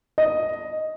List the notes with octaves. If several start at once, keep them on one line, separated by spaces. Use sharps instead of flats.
D#5